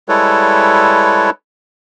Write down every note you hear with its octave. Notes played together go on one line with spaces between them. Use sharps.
G3 G#3 E4 A4 B4 C#5